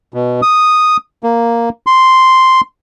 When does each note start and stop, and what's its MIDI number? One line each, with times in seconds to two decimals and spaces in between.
0.14 0.41 47
0.42 0.97 87
1.23 1.69 58
1.87 2.61 84